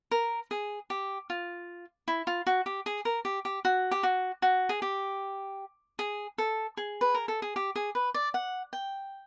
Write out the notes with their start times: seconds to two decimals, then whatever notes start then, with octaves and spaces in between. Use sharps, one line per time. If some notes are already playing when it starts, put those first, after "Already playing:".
0.11 A#4
0.51 G#4
0.90 G4
1.30 F4
2.08 E4
2.27 F4
2.47 F#4
2.66 G4
2.86 G#4
3.05 A#4
3.25 G4
3.45 G4
3.65 F#4
3.91 G4
4.03 F#4
4.42 F#4
4.69 G#4
4.82 G4
5.99 G#4
6.38 A4
6.77 G#4
7.01 B4
7.14 A#4
7.28 A4
7.42 G#4
7.56 G4
7.76 G#4
7.95 B4
8.14 D5
8.34 F#5
8.73 G5